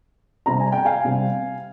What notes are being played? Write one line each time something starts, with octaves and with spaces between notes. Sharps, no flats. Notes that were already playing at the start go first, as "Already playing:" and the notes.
C3 G3 C4 A#5
G#5
G5
F5 G#5
C3 G3 C4